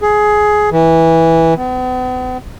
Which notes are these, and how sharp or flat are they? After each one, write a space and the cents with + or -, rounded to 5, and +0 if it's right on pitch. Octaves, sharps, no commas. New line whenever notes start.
G#4 +15
E3 -10
B3 +45